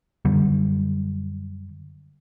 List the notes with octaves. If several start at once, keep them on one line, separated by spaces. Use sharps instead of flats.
F#2 D3 G3